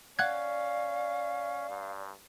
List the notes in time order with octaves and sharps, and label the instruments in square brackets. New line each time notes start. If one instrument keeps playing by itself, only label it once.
[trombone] C#4 [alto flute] D5 [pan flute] F5 [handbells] F#5 F#6 G#6
[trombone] G2